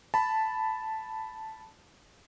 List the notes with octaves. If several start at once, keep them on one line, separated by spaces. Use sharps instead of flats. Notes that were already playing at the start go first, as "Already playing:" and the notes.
A5 B5